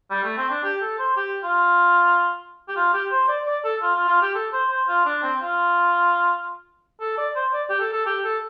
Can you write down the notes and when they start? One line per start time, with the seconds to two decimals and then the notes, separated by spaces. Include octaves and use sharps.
0.10 G3
0.24 A3
0.37 C4
0.50 D4
0.63 G4
0.81 A4
0.99 C5
1.16 G4
1.43 F4
2.68 G4
2.76 F4
2.93 G4
3.11 C5
3.29 D5
3.46 D5
3.64 A4
3.82 F4
3.95 F4
4.08 F4
4.22 G4
4.35 A4
4.53 C5
4.70 C5
4.88 F4
5.05 D4
5.23 C4
5.41 F4
7.00 A4
7.18 D5
7.35 C5
7.53 D5
7.69 G4
7.80 A4
7.92 A4
8.06 G4
8.24 A4